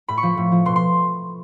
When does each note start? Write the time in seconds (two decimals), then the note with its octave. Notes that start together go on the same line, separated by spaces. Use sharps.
0.08 A2 B5
0.18 C#6
0.23 F3
0.37 A2
0.52 F3
0.65 B2 C6
0.76 C6